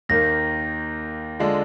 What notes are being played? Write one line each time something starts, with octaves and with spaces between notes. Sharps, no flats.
D#2 D#3 A#3 A#6
D3 G#3 D4 F4